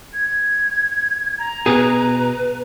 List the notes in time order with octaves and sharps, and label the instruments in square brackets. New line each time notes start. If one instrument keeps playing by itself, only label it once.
[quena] G#6
A#5
[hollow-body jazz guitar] B2 G#4 [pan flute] B4